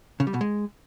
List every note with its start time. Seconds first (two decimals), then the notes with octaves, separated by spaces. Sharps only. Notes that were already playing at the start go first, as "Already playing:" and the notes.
0.20 C#3
0.27 G3
0.34 B2
0.41 G#3